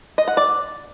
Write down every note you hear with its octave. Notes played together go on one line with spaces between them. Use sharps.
D#5
F#5
D5